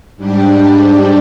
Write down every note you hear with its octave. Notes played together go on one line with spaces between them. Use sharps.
G#2 G3 D4 G4